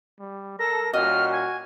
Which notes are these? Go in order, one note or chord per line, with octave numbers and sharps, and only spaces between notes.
G3
A4 A#4 A#6
A#2 G3 C#4 F#4 D#5 F6
G#5